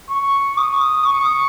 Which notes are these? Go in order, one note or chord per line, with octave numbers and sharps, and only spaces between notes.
C#6
D#6
C#6